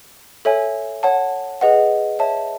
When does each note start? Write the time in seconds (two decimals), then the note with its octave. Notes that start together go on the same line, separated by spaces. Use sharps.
0.45 A4 C#5 E5 G#5
1.03 C#5 F#5 A5
1.61 G#4 B4 D#5 F#5
2.19 C#5 E5 A5